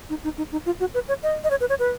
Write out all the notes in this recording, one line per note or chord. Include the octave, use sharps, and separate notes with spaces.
D#4
D#4
D#4
D#4
F4
F#4
B4
C#5
D#5
D#5
C#5
B4
C#5
B4